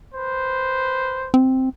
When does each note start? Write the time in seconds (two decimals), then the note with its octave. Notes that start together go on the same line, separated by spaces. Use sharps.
0.14 B4 C5
1.34 C4